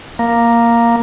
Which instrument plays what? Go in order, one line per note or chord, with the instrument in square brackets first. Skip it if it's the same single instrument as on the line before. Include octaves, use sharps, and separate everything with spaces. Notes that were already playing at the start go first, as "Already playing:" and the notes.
[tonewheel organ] A#3